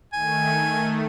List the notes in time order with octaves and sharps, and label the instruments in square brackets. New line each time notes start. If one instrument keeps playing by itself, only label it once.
[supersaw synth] D#3 A3 [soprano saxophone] G#5